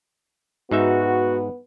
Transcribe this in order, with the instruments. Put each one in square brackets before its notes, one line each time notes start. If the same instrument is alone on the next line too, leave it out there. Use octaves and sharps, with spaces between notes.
[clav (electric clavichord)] G#2 D#4 E5 [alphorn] B3 [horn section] F#4